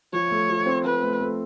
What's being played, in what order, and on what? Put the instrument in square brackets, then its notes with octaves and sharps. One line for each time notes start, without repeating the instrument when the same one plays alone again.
[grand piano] F3 [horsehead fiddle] C#5
[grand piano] A3
F3
C4
[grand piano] C4 [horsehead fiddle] B4
[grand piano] A3
A3